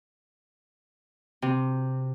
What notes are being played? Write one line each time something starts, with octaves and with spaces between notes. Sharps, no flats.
C3